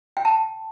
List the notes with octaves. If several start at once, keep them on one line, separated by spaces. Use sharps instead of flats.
G5
A5